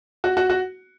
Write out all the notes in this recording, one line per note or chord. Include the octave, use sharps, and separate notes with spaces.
F#4
F#4
F#4